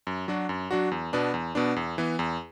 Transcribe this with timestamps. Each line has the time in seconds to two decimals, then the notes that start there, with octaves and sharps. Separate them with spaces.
0.07 F#2
0.28 F#3 D4 F#4
0.49 F#2
0.71 F#3 D4 F#4
0.91 E2
1.13 B2 B3 D4
1.34 E2
1.55 B2 B3 D4
1.76 E2
1.98 E3 B3
2.19 E2